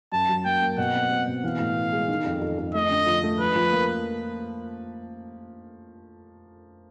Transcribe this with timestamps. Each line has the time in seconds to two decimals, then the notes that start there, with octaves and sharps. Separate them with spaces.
0.12 F#2 A5
0.29 F#3
0.45 A#3 G5
0.62 A#3
0.78 B2 F#5
0.94 C4
1.11 C4
1.27 B2
1.43 E3 F5
1.60 A2
1.77 B3
1.93 G#3
2.09 D#3
2.25 F2
2.41 F2
2.58 F2
2.74 A3 D#5
2.91 D3
3.07 F3
3.23 A3
3.39 F3 B4
3.56 F3
3.73 A#3